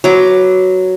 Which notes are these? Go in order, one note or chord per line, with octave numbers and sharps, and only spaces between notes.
F#3 B4 D6